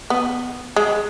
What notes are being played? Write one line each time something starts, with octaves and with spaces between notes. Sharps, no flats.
B3
G#3